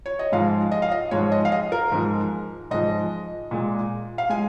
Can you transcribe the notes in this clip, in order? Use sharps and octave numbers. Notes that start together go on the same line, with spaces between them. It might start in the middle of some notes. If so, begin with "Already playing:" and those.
C#5
D#5
G#2 F3 G#3 F5
D#5
F5
D#5
G#2 F3 G#3 C#5
D#5
F5
D#5
A#4
G#2 F3 G#3
G#2 F3 G#3 D#5
A#2 G#3
F5
G#3 G#5